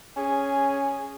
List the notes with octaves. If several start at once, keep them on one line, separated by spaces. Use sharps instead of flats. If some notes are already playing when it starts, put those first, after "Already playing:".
C#4 G#4